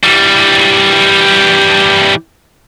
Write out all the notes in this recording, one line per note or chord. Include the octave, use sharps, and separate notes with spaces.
E3 G3